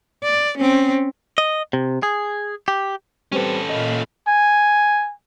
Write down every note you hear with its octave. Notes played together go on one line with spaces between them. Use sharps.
D5
C4 C#4
D#5
C3
G#4
G4
G3 C4 C#4 A4 B4
A#2 D#5 F5 B5
G#5